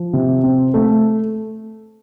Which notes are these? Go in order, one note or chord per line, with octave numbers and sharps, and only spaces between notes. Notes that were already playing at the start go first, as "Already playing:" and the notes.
Already playing: F3
C3
C4
A3